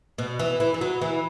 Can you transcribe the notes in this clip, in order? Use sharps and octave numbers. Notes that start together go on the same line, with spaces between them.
B2
E3
E3
E3
F#3
E3